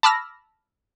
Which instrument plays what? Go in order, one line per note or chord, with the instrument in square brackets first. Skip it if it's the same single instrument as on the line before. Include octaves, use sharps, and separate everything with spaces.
[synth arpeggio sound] A5 B5 D6 E6 F6 A#6